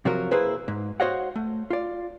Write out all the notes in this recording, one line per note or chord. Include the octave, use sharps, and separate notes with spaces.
C3 F3 F#3 F#4 A#4
A#3 E4 G#4 B4 C5
G#2
F#4 C5 C#5 D#5 F5 F#5
A3
F4 D5